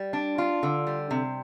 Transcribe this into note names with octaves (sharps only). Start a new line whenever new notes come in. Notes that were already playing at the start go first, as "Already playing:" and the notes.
Already playing: G3
D4
F4
D3
G3
C3